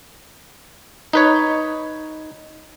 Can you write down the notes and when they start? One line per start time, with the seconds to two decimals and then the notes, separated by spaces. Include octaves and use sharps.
1.13 D#4 B4 C#5